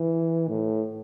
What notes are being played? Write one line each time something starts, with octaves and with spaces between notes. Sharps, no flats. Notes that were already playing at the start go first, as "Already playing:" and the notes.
Already playing: E3
A2